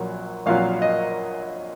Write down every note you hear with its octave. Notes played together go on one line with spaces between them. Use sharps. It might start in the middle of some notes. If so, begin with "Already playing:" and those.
Already playing: A#1 A#2 F#3
A#1 A#2 F#3 F5
D#5